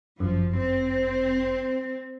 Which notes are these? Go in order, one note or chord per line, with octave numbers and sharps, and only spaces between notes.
G1 F#2 F3
C4